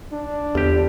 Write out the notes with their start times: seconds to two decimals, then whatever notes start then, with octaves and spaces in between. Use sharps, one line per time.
0.12 D4
0.55 G1 E2 G4